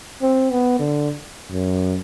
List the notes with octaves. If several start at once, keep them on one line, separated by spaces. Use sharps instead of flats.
C4
B3
D3
F#2